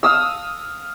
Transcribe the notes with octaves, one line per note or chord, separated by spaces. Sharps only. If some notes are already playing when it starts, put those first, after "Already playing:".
F5 D#6 E6